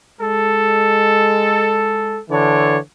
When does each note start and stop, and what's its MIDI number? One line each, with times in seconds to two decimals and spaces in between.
0.20 2.20 56
0.20 2.20 69
2.29 2.77 50
2.29 2.77 52
2.29 2.77 62
2.29 2.77 73